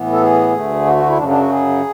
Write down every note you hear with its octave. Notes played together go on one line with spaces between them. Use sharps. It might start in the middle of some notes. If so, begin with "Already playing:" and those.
Already playing: A2 E3 B3
A4
G#4
D2 D3 A3
F#4
F#4
E4
F#2 C#3 F#3 D4
D4
F#4
G#4